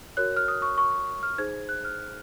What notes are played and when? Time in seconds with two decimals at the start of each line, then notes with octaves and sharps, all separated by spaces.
0.17 F#4 A#4 C#5 F#6
0.37 F6
0.48 D#6
0.62 C#6
0.78 C#6
1.23 F6
1.38 D#4 G#4 C5 G#6
1.69 F#6
1.85 F6